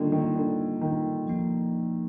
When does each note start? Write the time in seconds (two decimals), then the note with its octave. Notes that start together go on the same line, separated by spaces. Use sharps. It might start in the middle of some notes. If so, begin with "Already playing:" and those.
Already playing: D3 D#3 G3 A#3 F4 A#4
0.12 D#3
0.35 D3
0.81 D#3
1.27 F3 A#3 D#4